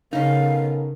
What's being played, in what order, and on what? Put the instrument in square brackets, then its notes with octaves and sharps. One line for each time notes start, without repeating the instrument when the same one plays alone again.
[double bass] C#3 [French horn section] B3 A4 A#4 [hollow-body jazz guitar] C#4 D#4 [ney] F5